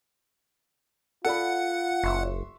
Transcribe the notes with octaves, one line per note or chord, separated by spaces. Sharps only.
F4 A4 D5 F#5 B5
F#1 E5 C6 C#6